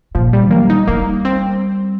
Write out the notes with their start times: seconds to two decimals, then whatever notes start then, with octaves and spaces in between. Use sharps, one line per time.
0.15 A#2 F3
0.33 G3
0.51 G3 A#3
0.70 D#4
0.87 G3 A#3
1.25 C4